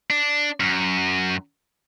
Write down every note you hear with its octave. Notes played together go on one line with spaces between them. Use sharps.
D4
F#2